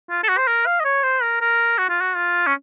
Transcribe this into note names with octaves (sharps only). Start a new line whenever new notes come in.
F4
A4
F#4
C5
A#4
F5
D#5
C#5
C5
A#4
A#4
F#4
F4
F#4
F4
C#4